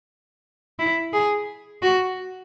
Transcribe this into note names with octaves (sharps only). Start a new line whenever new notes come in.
E4
G#4
F#4